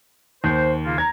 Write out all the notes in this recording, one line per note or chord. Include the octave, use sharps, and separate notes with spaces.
D#2 C5
C#3 A#3 F4
A#5 G#6